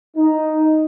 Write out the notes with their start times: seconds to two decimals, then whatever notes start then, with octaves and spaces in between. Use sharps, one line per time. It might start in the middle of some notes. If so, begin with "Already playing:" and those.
0.16 D#4